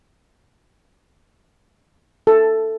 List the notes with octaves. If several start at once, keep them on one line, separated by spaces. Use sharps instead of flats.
A4